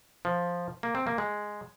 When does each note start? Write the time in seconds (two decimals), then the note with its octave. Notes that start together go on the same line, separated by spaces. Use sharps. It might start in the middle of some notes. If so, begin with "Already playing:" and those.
0.25 F3
0.83 A#3
0.95 C4
1.07 A#3
1.18 G#3